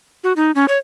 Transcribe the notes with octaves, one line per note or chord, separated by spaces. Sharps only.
F#4
D#4
C#4
C#5